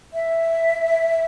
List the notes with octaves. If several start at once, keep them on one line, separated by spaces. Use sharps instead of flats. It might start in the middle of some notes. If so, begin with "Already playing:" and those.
E5